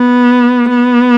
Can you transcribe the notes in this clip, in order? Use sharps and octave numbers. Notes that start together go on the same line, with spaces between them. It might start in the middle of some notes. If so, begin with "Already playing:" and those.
Already playing: B3
B3